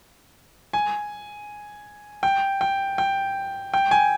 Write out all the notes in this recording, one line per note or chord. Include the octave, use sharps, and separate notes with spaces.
G#5
G5
G5
G5
G5
G#5